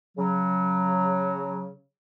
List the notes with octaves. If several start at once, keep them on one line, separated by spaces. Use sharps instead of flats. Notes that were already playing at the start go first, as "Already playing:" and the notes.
C#3 F#3